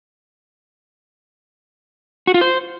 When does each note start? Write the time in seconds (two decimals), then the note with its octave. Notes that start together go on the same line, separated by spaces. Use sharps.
2.27 F#4
2.34 F4
2.41 C5